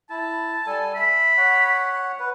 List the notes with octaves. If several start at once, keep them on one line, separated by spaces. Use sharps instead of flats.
E4 A5
G3 A4 G#5
E5 B5
C#5 F#5
B4